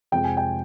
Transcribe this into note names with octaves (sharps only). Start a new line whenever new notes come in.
F2 C3 F3 G#3 G5
G#5
G5